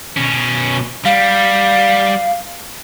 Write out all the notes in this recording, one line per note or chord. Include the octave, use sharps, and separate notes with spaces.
B2 C#4
G3 F5